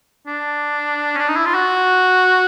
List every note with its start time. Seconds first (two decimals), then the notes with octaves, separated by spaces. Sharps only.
0.27 D4
1.15 C#4
1.18 D4
1.28 D#4
1.36 E4
1.45 F4
1.54 F#4